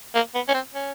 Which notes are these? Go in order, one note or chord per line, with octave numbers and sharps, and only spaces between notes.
A#3
B3
C#4
C4
C#4